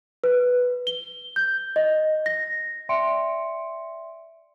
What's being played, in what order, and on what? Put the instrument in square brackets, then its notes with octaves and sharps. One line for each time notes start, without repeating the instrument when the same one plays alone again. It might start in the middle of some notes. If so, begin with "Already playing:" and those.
[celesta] B4
G7
G6
D#5
A#6
D5 E5 G5 C6 C#7 D7